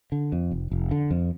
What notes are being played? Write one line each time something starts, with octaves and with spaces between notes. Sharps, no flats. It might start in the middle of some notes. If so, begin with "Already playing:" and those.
D3
F2
F1
F1
D3
F2